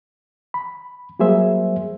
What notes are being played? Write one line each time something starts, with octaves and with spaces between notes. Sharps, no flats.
B5
F#3 G3 A#3 G#4 C5 E5